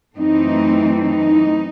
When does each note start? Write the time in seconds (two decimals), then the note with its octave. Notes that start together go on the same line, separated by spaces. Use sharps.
0.16 F#2 E3 A3 C4 D#4
1.00 D#4